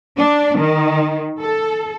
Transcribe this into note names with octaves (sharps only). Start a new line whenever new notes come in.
D4
D#3
A4